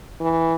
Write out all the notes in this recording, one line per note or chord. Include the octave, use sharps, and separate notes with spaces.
E3